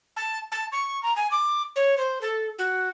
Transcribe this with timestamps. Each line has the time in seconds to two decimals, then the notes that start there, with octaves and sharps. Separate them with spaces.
0.16 A5
0.52 A5
0.72 C#6
1.03 A#5
1.16 G#5
1.31 D6
1.76 C#5
1.97 C5
2.21 A4
2.58 F#4